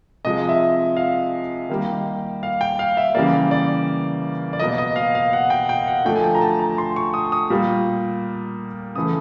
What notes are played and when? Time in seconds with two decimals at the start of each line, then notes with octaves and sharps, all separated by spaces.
0.25 C3 F3 G#3 D#5
0.49 E5
0.97 F5
1.69 D#3 G3 A#3
2.43 F5
2.61 G5
2.79 F5
2.97 E5
3.14 C#3 E3 G3 A#3 D5
3.51 D5
4.53 D5
4.59 B2 F#3 A#3 D#5
4.78 D#5
4.96 F5
5.15 F5
5.33 F#5
5.50 G5
5.69 G5
5.88 F#5
6.05 D3 F3 A3 G5
6.16 G#5
6.24 G5
6.35 A#5
6.41 A5
6.59 A#5
6.78 C6
6.96 C#6
7.14 D#6
7.32 D#6
7.50 A#2 G3 A#3
8.96 C#3 E3 A3 D#6